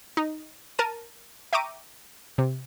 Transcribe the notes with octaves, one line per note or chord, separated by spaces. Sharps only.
D#4
A#4 A5 D#7
E5 G5 A#5 C#6 D6 D#7
C3